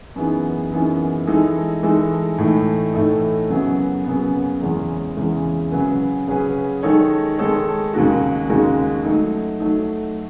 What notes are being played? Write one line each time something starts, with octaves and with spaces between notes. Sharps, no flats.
F#2 E3 B3 D#4 G#4
F#2 E3 B3 D#4 G#4
E3 G#3 D#4 A4
E3 G#3 D#4 A4
A2 E3 A3 D#4
A2 E3 A3 D#4
F#2 C#3 F#3 B3
F#2 C#3 F#3 B3
E2 C#3 E3 G#3 C#4
E2 C#3 E3 G#3 C#4
C#3 F#3 C#4 G#4 B4
C#3 F#3 C#4 G#4 B4
D#3 G#3 D#4 A4 C#5
D#3 G#3 D#4 A4 C#5
D#2 C#3 G#3 D#4 F#4
D#2 C#3 G#3 D#4 F#4
F#3 A3 D#4
F#3 A3 D#4